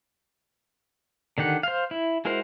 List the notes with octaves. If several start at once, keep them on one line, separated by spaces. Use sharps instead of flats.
D3 D#3 G4 F#5
C5 F5
E4
G#3 E4 F#4 A#4 C5